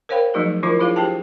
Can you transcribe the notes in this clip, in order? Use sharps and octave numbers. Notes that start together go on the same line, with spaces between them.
A#4 C5 C#5 F5 G5 B5
F3 F#3 A3 D#4 F#4 G#4
D#3 F3 D4 E4 F4 A#4
D4 E4 F4 G#4 C#5 F5
D4 G4 G#4 C5 G5 A5